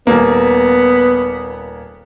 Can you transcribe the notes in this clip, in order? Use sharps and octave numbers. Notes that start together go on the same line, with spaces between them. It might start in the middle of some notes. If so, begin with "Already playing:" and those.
D#1 A#3 B3